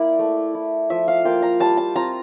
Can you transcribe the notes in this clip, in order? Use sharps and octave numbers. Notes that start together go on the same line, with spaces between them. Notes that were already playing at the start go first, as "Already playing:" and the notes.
Already playing: A#3 E4 D5
A3
E4
F3 E5
F5
A#3 F4 G5
A#5
G3 A5
A5
C4 F4 A#5